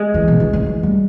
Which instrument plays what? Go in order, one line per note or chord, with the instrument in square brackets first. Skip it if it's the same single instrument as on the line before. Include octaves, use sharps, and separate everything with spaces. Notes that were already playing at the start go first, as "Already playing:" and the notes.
Already playing: [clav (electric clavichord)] G#3
[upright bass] E3
B2
E3
E3
E3
G3